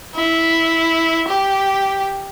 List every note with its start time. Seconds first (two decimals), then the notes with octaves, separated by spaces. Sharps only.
0.16 E4
1.27 G4